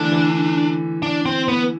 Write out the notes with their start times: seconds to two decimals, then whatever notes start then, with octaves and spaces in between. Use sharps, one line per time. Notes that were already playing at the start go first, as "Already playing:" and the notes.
Already playing: D3 E3 A3 D4
0.12 E3
1.02 D4
1.26 C4
1.48 B3